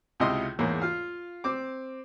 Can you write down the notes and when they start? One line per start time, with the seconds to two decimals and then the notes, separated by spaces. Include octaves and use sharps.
0.20 C#2 C3 E4 F4 D#5 C6
0.59 E2 G#2 A#3 C#5
0.82 F4 F5
1.44 C4 D6